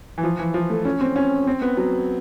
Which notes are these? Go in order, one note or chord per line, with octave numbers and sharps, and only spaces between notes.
E3
F3
E3
F3
A3
C#4
C4
C#4
C4
B3
F#3